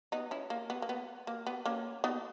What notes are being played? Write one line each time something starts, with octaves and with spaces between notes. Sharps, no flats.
B3 D#4
C#4 E4
A#3
B3
A#3
B3
A#3
B3
A#3 C#4
B3 D#4